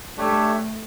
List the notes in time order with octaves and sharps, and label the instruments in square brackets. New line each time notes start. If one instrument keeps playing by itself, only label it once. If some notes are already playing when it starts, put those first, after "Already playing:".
[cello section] A3 [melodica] D4 G4 C#5 E5